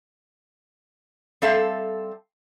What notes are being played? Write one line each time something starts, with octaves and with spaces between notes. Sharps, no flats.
G3 C4 A4 E5 F5